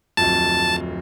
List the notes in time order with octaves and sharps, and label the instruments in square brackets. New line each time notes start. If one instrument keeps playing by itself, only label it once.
[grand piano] D1 F2 [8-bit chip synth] A5